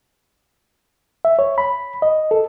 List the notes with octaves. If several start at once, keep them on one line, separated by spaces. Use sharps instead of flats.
E5
C#5
B5
D#5
A4